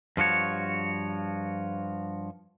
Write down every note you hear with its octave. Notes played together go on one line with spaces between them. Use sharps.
G2 F3 F#4 C#5